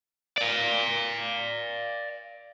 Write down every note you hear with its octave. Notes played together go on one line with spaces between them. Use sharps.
D5 F5